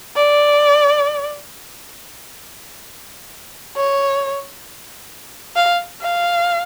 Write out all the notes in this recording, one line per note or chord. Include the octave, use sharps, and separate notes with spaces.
D5
C#5
F5
F5